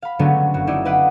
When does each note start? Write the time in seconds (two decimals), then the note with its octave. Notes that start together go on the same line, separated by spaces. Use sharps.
0.02 F5 B5
0.19 D3 F#3 G#3 A3 B3 C#4
0.54 F#1 F#4
0.67 A3 D#4 E4 D5 D#5
0.85 B4 D#5 F5 F#5 D6